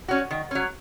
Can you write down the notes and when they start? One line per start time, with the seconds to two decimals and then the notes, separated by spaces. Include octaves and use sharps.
0.08 C#4 F#4
0.31 D#3
0.51 F#3 C#4